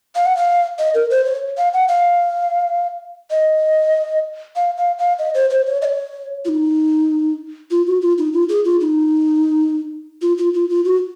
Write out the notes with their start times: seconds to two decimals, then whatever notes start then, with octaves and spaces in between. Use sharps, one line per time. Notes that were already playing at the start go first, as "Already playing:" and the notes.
0.15 F5
0.26 F#5
0.37 F5
0.79 D#5
0.94 A#4
1.10 C5
1.26 C#5
1.57 F5
1.74 F#5
1.88 F5
3.31 D#5
4.56 F5
4.77 F5
4.98 F5
5.19 D#5
5.34 C5
5.50 C5
5.67 C#5
5.82 D#5
5.85 C#5
6.45 F4
6.49 D#4
7.71 F4
7.87 F#4
8.02 F4
8.18 D#4
8.33 F4
8.49 G#4
8.65 F4
8.81 D#4
10.22 F4
10.38 F4
10.54 F4
10.70 F4
10.85 F#4